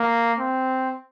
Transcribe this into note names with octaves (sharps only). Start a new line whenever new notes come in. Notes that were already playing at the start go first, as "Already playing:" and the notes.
Already playing: A#3
C4